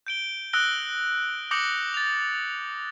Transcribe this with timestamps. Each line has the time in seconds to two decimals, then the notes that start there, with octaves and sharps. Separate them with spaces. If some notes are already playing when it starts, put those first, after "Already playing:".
0.07 G6 D7 G7
0.53 D#6 E6 F#6 A#6 D7 G7
1.51 D6 D#6 G6 A#6 C#7 F#7
1.94 A6 F7